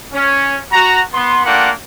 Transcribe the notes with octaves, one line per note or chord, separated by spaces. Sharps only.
C#4
F#4 A#5
B3 C6
A3 A#3 D4 F4 F#5 G5